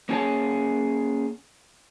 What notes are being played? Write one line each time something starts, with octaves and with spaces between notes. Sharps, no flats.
A#3 C#4 G4 G#4 C#5 A5